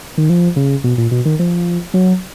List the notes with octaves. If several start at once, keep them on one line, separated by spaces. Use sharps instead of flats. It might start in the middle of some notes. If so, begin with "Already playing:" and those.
D#3
F3
C#3
B2
A#2
B2
D#3
F3
F#3